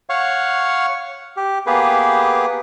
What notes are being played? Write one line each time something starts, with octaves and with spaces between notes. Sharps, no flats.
C#5 F5 F#5 C#6
G4
A#3 B3 G4 G#4 B4